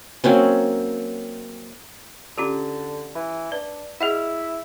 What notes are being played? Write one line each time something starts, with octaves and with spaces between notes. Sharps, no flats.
F#3 A#3 C4 C#4
D3 C#4 F4 G4
E3
D4 B4
E4 G#4 D#5 F#5